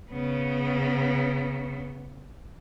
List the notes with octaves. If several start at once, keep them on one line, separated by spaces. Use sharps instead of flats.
C#3 B3